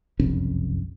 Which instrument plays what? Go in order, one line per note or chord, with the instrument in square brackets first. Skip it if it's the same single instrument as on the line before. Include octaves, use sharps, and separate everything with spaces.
[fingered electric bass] F#1 C2 F2 C#4